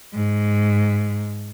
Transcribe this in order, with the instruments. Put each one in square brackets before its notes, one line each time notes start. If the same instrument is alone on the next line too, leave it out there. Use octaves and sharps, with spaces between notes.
[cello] G#2